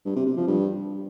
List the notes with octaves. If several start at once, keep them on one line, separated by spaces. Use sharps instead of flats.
G2
C3
C3
F3
G2